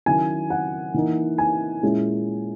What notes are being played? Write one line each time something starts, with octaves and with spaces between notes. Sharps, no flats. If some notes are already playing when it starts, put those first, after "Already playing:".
D#3 F#3 C#4 E4 G#5
F#5
E3 A#3 D#4
G#5
A#2 G#3 C#4 E4